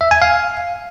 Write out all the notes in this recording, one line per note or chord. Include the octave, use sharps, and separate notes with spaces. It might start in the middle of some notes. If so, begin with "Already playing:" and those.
E5
G#5
F5